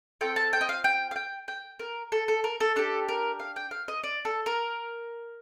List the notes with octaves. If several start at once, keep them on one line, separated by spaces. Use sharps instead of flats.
C4 F4 A4 G5
A5
G5
D#5
F5
G5
F5
G5
G5
A#4
A4
A4
A#4
A4
D4 G4 A4
A#4
F5
G5
F5
D#5
D5
A4
A#4